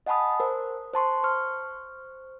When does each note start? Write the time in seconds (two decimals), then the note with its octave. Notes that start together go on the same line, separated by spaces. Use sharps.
0.06 D#5 F#5 G#5 A5 B5 D#6
0.40 A#4 C5
0.93 C5 A5 C6 C#6
1.24 C5 C#6 F6